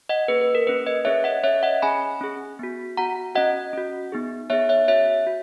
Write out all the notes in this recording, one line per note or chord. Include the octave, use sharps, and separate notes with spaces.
D#5 F#5
A#3 C#4 G#4 B4
B4
A#4
A#3 C#4 G#4 B4
B4 D#5
C#4 G#4 C#5 E5
D#5 F#5
C#4 G#4 C#5 E5
D#5 F#5
C#4 G#4 G#5 B5
C#4 G#4
B3 F#4
B3 F#4 F#5 A#5
C#4 F#4 D#5 F#5
C#4 F#4
B3 D#4 G#4
B3 D#4 G#4 C#5 E5
C#5 E5
C#4 F#4 C#5 E5
F#4